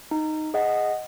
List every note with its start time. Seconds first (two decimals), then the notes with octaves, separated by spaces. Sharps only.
0.11 D#4
0.54 G#4 D#5 F#5